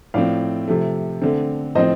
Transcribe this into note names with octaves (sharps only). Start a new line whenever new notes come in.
A2 F3 C4 D5 F5
C3 F3 A3
D3 A3 C4
A2 F3 C4 C5 D#5